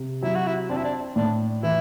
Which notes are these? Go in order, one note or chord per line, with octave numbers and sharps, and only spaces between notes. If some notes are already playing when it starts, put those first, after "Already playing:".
Already playing: C3
F#3 E4
F#4
E4
C4 D4
E4
D4
A2 D4
E3 E4